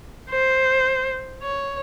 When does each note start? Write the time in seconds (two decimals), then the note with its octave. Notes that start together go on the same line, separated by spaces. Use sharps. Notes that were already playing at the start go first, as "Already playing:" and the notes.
0.31 C5
1.42 C#5